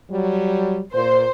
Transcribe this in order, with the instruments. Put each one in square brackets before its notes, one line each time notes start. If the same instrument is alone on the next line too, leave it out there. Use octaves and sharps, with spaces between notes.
[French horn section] F#3 G3
[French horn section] A#2 [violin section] C5